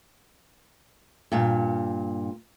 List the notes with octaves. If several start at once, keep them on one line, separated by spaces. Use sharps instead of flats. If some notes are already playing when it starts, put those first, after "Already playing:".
G2 A#2